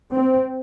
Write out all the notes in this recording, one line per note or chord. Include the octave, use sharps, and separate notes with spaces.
C4